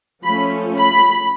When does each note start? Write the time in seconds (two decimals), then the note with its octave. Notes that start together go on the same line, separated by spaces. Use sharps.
0.24 F3 A3 C#4 B5
0.77 B5